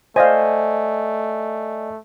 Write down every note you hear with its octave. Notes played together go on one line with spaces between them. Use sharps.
A3 C5 D5 D#5 F5 G#5